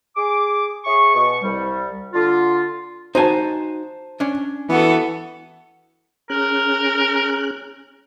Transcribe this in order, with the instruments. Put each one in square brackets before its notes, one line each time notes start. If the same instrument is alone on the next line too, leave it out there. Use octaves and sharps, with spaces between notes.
[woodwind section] G#4 D6
G#4 C#5 E5 C#6
B2 C#6
C2 G3
D3 F4
[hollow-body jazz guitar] D#4 F#4 G#5 [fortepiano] C5 A5
[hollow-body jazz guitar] C#4 D4
[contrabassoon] E3 [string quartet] B3 F#4 A4
[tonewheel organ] C#4 G#4 F#6 [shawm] A#4